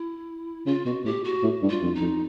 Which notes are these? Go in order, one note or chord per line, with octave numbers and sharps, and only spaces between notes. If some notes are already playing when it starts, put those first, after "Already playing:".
Already playing: E4
C#3 F4
B2 F#4
A2 G4
F#4
A2
G2
F4
F2
D#4
F2